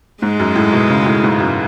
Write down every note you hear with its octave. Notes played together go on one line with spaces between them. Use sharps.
G#2 G#3
F#2
A2
B2
C#3
A2
G#2
F#2